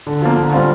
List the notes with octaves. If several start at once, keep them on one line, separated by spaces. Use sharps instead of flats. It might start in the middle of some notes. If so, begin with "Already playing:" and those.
D3
F3 A#3
D3
G3 C4 F4